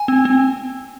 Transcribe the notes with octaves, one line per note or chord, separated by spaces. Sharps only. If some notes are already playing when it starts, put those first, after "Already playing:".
Already playing: G#5
C4
C4